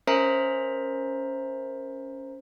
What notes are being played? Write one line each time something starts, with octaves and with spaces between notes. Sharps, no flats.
C#4 A#4 C5 E5 A#5